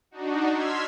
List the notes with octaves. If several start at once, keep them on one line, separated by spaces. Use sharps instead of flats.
D4 D#4 F#4
C6 E6 F6 G#6 B6